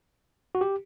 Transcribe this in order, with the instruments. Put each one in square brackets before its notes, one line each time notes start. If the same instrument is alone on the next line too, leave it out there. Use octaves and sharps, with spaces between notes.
[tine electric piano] F#4
G4